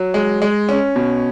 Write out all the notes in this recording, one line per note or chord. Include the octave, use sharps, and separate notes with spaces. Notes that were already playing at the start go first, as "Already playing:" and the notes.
Already playing: F#3
G#3
G#3
C#4
B2